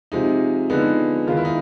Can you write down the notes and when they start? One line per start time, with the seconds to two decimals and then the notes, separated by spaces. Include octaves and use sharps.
0.12 C3 F3 G#3 D#4
0.70 D3 F3 G#3 B3 D#4
1.27 D#3 G#3 B3 F4
1.37 E4
1.45 D#4